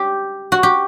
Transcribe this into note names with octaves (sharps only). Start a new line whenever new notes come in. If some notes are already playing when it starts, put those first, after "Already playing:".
Already playing: G4
F#4
G4